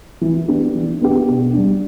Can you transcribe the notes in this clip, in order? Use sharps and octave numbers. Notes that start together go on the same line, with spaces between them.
E3
B3 D4 G4
E3
B3 D4 G4
B2
G3 D4